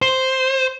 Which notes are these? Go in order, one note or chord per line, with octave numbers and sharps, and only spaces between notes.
C5